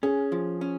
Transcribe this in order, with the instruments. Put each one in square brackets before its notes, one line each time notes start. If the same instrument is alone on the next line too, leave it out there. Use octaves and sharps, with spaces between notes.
[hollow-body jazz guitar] C#4 [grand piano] G#4
[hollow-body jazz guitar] F3
C#4